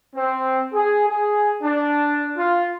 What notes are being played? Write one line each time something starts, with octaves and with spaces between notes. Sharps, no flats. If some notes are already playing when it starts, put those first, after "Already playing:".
C4
G#4
G#4
D4
F4